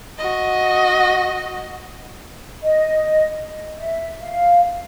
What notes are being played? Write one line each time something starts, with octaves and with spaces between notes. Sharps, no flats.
F#4 D#5
D#5
E5
F5